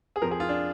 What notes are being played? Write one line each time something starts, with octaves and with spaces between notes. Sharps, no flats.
G#4
F2 F3 A#4
G#4
F4
D4